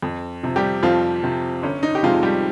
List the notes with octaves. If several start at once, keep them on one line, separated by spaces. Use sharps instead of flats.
F2
C3 F3
G3 G4
F2 F3 F4
C3 F3
G1 C#4
D#4
G4
F2 C3 F3 G#3 F4
G3 G4